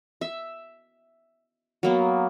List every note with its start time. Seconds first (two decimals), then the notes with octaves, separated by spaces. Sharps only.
0.21 E5
1.83 F#3 A#3 B3